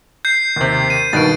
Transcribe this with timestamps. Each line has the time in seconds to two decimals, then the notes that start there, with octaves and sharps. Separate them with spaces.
0.25 G6 C7
0.56 D#2 C3
0.90 D#7
1.13 G2 B2 D#3 A6 D7